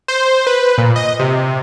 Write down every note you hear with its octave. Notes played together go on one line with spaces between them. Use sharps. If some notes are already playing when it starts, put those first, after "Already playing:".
C5
B4
A#2
D#5
C3